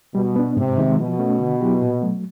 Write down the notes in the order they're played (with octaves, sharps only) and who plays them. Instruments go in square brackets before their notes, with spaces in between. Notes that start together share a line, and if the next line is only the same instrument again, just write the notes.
[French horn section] B2 [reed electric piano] G3
[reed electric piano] B3 D4
[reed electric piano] G#2 [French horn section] C3
[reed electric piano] D#3 G#3 C4
[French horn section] B2 [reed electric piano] F3
[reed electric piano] A3 C#4
D3
F#3 B3 E4 G4
A#2
F#3 A3